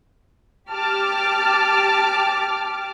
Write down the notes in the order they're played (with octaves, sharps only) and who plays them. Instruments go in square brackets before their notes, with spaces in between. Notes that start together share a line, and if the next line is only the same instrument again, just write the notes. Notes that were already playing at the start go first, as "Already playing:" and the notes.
[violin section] G4 A5 D6 F6